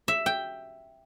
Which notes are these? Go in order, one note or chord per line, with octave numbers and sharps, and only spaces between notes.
E5
G5